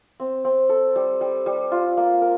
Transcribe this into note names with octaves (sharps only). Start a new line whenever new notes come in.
C4
C4
A4
G3
G3
G3
F4
A#3
A#4